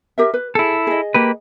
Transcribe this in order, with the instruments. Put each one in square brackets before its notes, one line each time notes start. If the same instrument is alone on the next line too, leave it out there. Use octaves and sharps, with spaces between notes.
[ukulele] G4 A#4 E5
B4
[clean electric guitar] E4 A4 [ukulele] G#4
[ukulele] G#4 D#5
[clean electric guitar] A#3 G4 B4